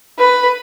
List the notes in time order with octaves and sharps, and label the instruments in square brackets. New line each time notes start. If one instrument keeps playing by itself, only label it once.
[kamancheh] B4